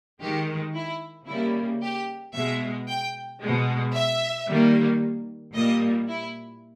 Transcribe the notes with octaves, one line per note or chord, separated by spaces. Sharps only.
D#3 G#3 G4
E4
C#3 G3 A#3 E4
G4
B2 G#3 E5
G5
B2 G#3
E5
D#3 G3 A#3
A#2 G3 A#3 D#5
E4